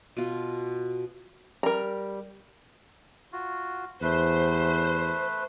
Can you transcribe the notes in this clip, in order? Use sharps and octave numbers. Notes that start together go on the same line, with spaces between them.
B2 F4
G3 A#4 A#5
F4 F#4
E2 A3 B4 C5